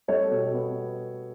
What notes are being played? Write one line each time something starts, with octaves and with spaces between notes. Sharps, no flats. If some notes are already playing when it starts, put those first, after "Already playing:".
G3 A4 C#5
B2
B3